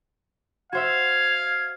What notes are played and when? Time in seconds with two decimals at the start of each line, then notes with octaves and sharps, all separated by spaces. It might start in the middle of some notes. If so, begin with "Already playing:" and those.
0.73 F#4 C5 E5 F5 G#6